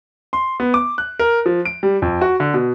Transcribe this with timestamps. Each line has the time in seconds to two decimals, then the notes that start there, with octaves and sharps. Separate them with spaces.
0.33 C6
0.60 B3
0.74 D6
0.98 F#6
1.19 A#4
1.46 F3
1.65 D7
1.83 G3
2.02 F2
2.21 F#4
2.40 D3
2.54 B2